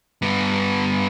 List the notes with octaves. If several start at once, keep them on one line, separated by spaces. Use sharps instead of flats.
G2 B3